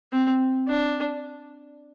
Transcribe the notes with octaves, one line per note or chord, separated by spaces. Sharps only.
C4
D4